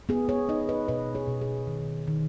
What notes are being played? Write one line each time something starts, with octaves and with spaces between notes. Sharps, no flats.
B3 G#4
G#4 C#5
D#4 B4 D#5
B4 D#5
B2 B4 D#5
G#4 C#5
B2
G#4
D#3
D#3